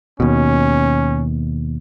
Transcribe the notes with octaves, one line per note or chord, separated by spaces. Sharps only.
D#2 B2 C#4